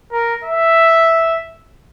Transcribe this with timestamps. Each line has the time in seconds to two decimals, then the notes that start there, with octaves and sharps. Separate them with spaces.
0.12 A#4
0.44 E5